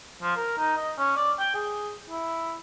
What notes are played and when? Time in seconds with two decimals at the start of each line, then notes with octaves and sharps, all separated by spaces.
0.22 F3
0.36 A#4
0.58 D#4
0.77 D#5
0.98 C#4
1.17 D5
1.39 G5
1.54 G#4
2.10 E4